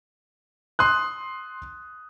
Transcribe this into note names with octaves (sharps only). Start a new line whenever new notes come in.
C6 D#6 F#6